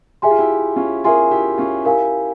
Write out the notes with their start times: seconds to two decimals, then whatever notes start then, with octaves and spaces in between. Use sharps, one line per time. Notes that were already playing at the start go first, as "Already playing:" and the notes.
0.22 G4 G#4 E5 G#5 C6
0.31 F4
0.39 E4 G4
0.76 C#4 F4
1.04 F4 G#4 A#4 E5 G#5 C6
1.31 E4 G4
1.58 C#4 F4
1.85 E4 G4 A#4 F5 G#5